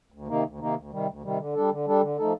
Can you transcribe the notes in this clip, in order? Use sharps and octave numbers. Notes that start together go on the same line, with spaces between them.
D2
C3 D#3 A#3 D#4
D2
C3 D#3 A#3 D#4
D2
C3 D#3 G3
D2
C3 D#3 G3
D3
G3 D4 A4
D3
G3 D4 A4
D3
F3 A3 D#4 A4